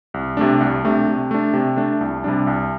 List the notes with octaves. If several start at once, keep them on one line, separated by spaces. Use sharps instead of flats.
C2
C3 A3 D4
C2
C3 A3 D4
C3
A3 D4
C3
A3 D4
C2
C3 G3 D4
C2